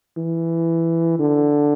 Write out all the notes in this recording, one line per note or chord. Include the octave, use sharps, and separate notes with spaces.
E3
D3